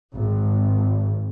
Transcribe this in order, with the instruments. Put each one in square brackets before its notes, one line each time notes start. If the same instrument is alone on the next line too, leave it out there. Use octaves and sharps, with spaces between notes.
[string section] G#1